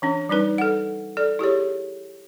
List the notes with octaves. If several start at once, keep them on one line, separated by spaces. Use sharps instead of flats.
E3 C#4 D4
G3 C#4 D#4 B4
A4 F#5
A4 D5
E4 G4 G#4 C#5